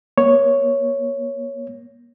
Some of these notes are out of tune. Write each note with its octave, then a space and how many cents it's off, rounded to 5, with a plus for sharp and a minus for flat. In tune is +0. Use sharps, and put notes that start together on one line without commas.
A#3 +40 C#5 +0